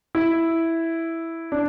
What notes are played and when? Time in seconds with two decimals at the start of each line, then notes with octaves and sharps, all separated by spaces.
0.15 E4
1.52 D4